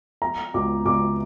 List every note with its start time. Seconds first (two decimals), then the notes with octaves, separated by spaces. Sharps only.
0.22 F3 A#5
0.54 C#2 D6
0.85 C#2 D6